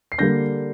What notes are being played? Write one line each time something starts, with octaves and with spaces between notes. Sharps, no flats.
C7
D3 G3 A#3 G6 A#6